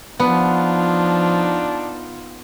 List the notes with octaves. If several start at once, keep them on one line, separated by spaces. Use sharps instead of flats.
F3 B3 D4 D#4 F4